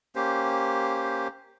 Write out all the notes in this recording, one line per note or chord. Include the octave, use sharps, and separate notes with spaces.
A#3 C#4 G4 C5